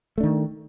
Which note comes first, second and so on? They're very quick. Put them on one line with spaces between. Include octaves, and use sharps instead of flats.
A3 D4 D#3